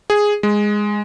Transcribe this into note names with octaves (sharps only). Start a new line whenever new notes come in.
G#4
G#3